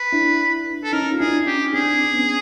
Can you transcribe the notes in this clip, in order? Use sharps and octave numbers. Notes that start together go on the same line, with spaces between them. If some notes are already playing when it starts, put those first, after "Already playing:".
Already playing: B4
D4 E4
A4
C#4 D#4 A#4
F4
D4 E4 G#4
C#4 D#4 G4
C4 D4 G#4
B3 C#4